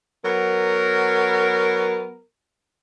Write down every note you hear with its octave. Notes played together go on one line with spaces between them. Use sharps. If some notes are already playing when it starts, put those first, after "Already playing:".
F#3 B3 A#4